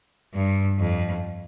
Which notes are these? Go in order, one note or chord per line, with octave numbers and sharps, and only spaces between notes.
G2
F2